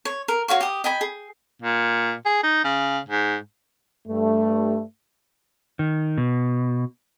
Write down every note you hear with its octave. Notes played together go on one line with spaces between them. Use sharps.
C#5
A#4
F#4 C#5 F5 C#6
G4 D#6
D#5 G5 G#5 B5
G#4
A#2
G#4
D#4
C#3
G#2
G2 A3
D#3
B2